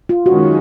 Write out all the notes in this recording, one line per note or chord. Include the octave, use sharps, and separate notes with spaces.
F4
F#2 D#3 G#3 C#4 F#4